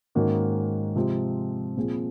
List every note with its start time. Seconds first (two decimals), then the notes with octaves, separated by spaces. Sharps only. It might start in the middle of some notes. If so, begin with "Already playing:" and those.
0.15 G#2 D#3 A#3 C#4 F#4
0.96 C3 F3 G#3 C4
1.77 A#2 F3 C4 F4 G#4